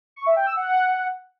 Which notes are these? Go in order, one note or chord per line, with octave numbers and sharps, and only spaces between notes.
C#6
E5
G5
E6
F#5